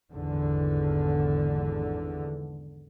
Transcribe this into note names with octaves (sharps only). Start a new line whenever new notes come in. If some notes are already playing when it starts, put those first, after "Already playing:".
G#1 E2 D3